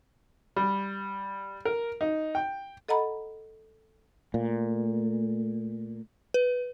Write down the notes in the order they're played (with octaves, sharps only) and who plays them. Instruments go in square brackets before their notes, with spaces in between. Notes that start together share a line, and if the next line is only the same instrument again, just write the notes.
[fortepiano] G3
A#4
D#4
G5
[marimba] A4 D#5 F#5 A#5 B5
[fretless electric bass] A#2 [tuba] A3
[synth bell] B4